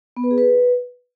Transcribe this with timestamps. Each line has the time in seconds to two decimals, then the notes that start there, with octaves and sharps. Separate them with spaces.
0.17 B3
0.24 B4
0.31 G#4
0.38 B4